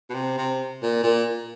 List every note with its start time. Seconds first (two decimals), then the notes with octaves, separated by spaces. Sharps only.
0.10 B2
0.15 C3
0.38 C3
0.82 A#2
1.04 A#2